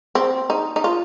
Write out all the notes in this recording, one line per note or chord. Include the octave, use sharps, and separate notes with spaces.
C4
D#4
D#4
F4